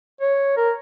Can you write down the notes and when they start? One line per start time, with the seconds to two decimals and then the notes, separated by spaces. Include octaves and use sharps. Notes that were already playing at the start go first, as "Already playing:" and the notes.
0.21 C#5
0.57 A#4